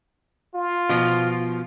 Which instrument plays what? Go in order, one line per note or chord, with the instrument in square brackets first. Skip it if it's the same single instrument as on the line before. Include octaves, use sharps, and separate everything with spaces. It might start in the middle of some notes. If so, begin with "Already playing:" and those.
[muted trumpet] F4
[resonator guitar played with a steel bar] B2 F3